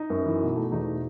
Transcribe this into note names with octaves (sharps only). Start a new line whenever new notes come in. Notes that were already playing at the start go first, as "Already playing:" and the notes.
Already playing: D#4
F#2
E3
B2
A3
E2 D#4
B2